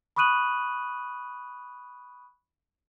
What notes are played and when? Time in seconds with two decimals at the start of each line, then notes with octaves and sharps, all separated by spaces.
0.16 B5 C#6 D#6 F#6 D#7 F#7